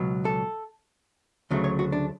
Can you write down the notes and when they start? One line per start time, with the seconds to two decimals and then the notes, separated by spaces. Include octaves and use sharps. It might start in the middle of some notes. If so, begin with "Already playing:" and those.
Already playing: C#2 B2 F#3
0.25 A4
1.51 D2 C#3 F#3 A3
1.64 C#5
1.79 F#4
1.92 D4